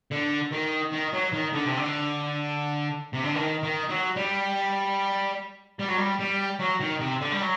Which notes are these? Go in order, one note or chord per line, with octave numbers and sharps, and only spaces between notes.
D3
D#3
D#3
F#3
D#3
D3
C3
D3
C3
D3
D#3
D#3
F#3
G3
G3
F#3
G3
G3
F#3
D#3
C3
D3
G3
F#3